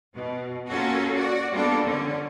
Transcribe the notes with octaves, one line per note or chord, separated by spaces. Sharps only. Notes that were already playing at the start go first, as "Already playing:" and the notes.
B2
A#3 C#4 F4 F#4 A4
F#4 D5
G3 A#3 B3 D4 F4 A4
D3 C#4